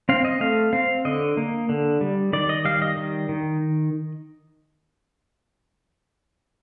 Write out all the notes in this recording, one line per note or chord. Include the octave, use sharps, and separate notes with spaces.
C4 F5
D#5
A3 F5
C4 F5
D3 D#5
A#3
D3
G3
D#3 D5
D#5
G3 F5
D#5
D#3
D#3